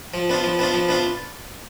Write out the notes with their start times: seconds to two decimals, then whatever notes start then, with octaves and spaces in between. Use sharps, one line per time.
0.14 F3
0.30 B3 D4 F4
0.44 F3
0.59 B3 D4 F4
0.74 F3
0.89 B3 D4 F4